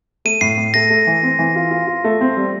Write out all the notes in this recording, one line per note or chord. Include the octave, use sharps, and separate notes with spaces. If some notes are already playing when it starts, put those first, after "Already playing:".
A3 D#7
A2 C7
A2
A3 A#6
A3
E3
C4
E3
F4
F4
F4
A3
C4
G3